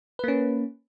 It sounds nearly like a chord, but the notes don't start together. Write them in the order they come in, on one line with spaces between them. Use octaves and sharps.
B4 A#3 C#4